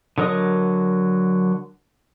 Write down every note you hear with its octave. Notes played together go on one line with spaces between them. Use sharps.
D3 F#3 A#4 D#5 D#6